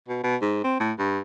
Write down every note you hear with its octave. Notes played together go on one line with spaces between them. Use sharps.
B2
B2
G#2
C4
A2
G2